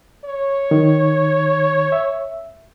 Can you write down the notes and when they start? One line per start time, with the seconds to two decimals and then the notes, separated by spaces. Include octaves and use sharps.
0.25 C#5
0.71 D#3
1.92 E5